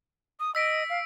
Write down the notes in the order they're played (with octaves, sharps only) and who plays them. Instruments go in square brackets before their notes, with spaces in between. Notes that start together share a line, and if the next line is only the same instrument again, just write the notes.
[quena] D#6
[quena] D#5 [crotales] E6 B6 D7
[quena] F5